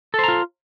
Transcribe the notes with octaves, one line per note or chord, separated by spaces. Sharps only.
F4 A4 C5 A#5